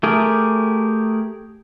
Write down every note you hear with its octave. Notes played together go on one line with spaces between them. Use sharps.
A3 G4 G#4 A#4